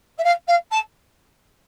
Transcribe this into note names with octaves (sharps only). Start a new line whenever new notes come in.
E5
F5
F5
A5